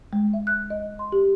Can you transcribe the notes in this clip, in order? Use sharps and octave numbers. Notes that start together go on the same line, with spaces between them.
G#3
E5
F#6
D#5
C6
G4